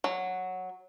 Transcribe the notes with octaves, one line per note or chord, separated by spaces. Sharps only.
F#3